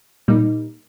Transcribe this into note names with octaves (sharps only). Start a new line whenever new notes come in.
A#2 G3 A#3 D#4